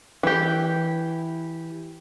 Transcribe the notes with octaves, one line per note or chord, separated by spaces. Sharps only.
E3 G4